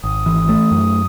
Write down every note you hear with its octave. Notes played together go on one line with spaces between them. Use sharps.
G#1 D#6
E3
A3
F#2